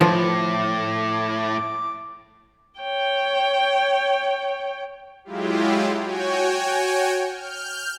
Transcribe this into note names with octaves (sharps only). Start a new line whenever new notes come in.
A2 F3 D6
C#5 G5
F#3 G#3 E4 F4 G4
F#4 C#5 G5 G#5
F6 G6